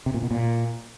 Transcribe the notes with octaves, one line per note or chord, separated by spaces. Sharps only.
C3
A#2
B2
A#2